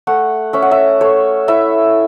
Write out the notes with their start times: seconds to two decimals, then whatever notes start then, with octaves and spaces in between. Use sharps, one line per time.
0.07 A3 F#5
0.53 C#4 E5
0.62 F#5
0.71 E5
1.01 A3 C#5
1.48 E4 E5